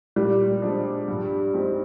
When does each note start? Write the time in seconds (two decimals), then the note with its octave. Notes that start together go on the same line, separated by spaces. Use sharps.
0.16 A#2 G3
0.62 F3 G#3 D4
1.08 G2
1.54 F3 G#3 C4 D#4